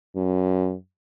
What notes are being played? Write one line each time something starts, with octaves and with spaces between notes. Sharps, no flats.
F#2